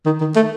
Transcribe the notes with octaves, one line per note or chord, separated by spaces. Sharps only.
D#3
D#3
A3